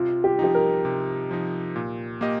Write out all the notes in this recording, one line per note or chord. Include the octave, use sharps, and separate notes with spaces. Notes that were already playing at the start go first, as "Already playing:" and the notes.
Already playing: C3 F4
G4
F3 D#4 G4
A#4
C3
F3 D#4
A#2
A#3 G4 D#5